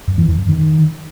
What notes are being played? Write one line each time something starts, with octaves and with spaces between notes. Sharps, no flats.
F#2
E3
F2
F#2
D#3